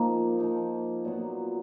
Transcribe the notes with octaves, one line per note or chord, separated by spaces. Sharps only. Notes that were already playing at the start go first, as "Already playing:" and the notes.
Already playing: F3 A#3 D#4
F3 A#3 D#4
A#2 F#3 B3